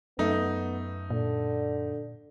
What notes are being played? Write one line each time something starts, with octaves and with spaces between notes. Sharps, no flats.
F#2 A3 B3 D#4
A#2 D3